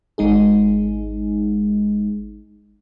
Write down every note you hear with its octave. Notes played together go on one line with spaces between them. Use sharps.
G#1 G#3 D#4 G#4